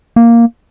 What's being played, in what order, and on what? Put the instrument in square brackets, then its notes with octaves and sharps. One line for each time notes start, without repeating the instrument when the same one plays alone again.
[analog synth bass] A#3